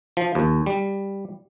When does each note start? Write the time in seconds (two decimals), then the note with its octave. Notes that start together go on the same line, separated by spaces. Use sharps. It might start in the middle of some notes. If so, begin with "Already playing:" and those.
0.17 F3
0.35 D#2
0.66 G3